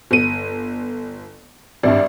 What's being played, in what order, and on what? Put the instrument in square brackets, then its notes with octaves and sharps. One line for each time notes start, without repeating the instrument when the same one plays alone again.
[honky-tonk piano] G1 D#7
[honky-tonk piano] G#1 G2 [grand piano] D5 E5